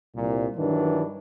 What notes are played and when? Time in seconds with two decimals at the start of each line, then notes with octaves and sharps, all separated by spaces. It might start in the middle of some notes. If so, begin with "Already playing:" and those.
0.15 C2 A#2
0.57 G2 D#3 E3 F#3 D4